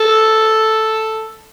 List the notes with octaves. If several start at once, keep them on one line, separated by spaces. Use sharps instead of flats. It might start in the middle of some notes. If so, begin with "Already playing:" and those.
Already playing: A4